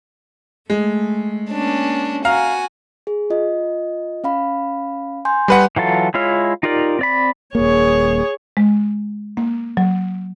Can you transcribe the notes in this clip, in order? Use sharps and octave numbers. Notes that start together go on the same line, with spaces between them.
G#3 A3
A#3 C#4 D4
F#4 F5 G#5 A#5 F6
G#4
F4 D#5
C#4 F5 B5
G#5 C6 G6
G3 B4 F#5
E3 F#3 F4 A4
G#3 E4 F4 C#5 F6
D#4 F4 G4 A#4 D5
C4 D5 B5
D#1 A#3 G#4 C#5
G#3
A#3
F#3